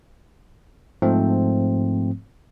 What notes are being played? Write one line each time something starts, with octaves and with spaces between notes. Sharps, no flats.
G#2 F3 A3 C4